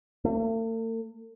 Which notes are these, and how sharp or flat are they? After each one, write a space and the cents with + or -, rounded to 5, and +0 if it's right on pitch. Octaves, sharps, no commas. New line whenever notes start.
A3 +45